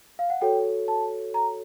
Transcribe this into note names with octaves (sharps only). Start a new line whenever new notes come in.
F5
F#5
F#4 A4 C#5 G5
A5
A#5